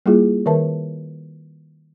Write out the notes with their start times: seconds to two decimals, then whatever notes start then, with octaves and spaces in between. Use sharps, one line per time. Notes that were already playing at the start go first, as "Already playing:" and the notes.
0.06 G3 A#3 E4 F4 G#4
0.46 D#3 A#4 B4 E5 A5